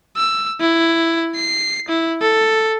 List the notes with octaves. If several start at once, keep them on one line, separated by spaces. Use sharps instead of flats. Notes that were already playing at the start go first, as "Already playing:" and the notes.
E6
E4
C7
E4
A4